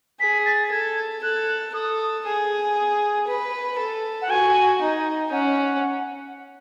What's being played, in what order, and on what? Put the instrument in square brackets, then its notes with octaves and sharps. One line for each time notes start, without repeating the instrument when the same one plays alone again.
[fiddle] G#4 [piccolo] B6
[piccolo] A6
[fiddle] A4 [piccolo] G#6
[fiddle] A4 [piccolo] F#6
[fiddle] A4 [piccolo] D#6
[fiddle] G#4
B4
A4
[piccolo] F#5
[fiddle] F#4 [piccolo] G#5
[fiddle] D#4
[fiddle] C#4 [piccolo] F#5